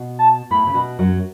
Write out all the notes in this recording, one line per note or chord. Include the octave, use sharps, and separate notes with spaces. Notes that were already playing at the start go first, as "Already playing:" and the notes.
Already playing: B2
A5
A2 B5
C#3
B2
F#2 F#3